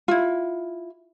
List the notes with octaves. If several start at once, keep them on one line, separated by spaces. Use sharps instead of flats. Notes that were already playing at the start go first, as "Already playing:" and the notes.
E4 F4